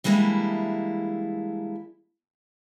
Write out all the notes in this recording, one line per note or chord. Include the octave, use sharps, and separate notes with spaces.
E3 G3 G#3 A#3 D4 E4